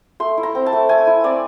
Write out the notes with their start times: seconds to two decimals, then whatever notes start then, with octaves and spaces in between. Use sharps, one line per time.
0.20 A3 C6
0.38 E4
0.43 A#5
0.55 C4
0.66 A5
0.72 A3
0.89 A3 G#5
1.07 E4
1.24 C4 D5